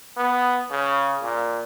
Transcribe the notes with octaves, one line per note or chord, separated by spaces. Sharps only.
B3
C#3
A#2